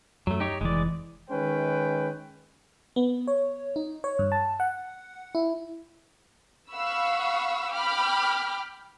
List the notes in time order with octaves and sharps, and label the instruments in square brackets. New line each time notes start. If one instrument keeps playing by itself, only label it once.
[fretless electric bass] F#2 [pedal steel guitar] F#3 A3
[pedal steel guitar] D#4 G4 C#5
[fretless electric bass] F1 E3 [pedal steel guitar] G#3 D5
[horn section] D#3 G#3 C#4 B4 G5
[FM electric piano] B3
C#5
D#4
C#5
G2
A5
F#5
E4
[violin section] F5 F#5 B5 C#6 E6
G5 B5 D6 F6